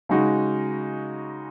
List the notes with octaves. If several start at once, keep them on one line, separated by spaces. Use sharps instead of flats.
C#3 G#3 D#4 F#4